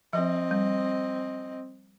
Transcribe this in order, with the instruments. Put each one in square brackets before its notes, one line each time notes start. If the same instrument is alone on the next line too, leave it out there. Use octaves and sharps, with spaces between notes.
[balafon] F3 [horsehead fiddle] C4 D#5
[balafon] G3